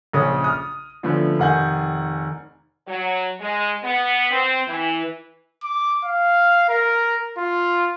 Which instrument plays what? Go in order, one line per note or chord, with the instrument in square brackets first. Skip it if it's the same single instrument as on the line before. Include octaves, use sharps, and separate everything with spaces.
[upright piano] A#1 C#3 C#5 D#6
D#6 F6
D3 F3 A3 B3 C#4
F1 D#3 F#5 G#5 G6
[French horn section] F#3
G#3
B3
C4
E3
[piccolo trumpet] D6
F5
A#4
F4